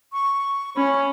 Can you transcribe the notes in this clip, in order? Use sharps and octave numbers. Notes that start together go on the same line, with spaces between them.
C#6
C#4 B5